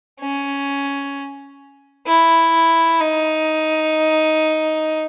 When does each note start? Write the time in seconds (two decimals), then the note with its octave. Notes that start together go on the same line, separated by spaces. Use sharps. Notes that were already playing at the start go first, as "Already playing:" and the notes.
0.20 C#4
2.07 E4
3.01 D#4